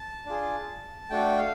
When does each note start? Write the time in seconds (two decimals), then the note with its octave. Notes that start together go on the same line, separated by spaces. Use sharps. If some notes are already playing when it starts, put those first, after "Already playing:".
Already playing: A5
0.26 D4 F4 G#4
1.10 A3 D4 F#4 G5
1.38 F5